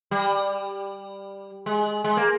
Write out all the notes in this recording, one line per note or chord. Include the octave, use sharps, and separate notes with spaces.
G3
G#3
G#3
A#3